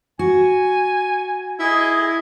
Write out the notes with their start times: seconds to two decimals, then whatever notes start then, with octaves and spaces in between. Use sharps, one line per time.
0.19 F#4 G#5
1.60 E4 G#4 D#5